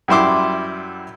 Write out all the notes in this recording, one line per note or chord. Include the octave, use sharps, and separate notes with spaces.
F#2 G3 E4 C6 D6